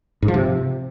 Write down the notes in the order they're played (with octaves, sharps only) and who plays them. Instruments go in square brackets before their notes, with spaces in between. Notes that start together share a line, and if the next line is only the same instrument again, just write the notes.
[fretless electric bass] G#2
F3
C3